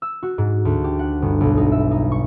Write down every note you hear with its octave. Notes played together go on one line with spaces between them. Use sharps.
E6
F#4
G#2
D2
G4
F#5
G1
B1
D#4
E5
D#4
C#6